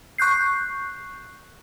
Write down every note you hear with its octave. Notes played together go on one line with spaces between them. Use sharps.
C#6 F#6 G6 C7